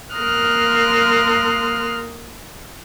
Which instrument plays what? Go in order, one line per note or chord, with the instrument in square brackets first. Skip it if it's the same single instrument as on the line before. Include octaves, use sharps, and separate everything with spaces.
[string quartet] A#3 A#4 C6 D#6 F6 F#6